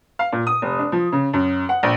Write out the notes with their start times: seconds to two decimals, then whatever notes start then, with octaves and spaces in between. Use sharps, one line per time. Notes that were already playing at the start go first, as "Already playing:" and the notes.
0.19 F5
0.32 A#2
0.47 D#6
0.62 F1
0.79 D4
0.92 F3
1.12 C#3
1.33 F#2
1.69 F#5
1.83 A#1